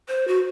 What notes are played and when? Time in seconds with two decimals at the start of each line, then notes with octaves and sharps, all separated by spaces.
0.09 C5
0.28 F#4